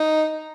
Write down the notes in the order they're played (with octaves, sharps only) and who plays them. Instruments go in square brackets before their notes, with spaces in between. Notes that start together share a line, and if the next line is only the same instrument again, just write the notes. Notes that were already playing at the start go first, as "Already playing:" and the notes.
Already playing: [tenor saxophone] D#4 [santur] A#5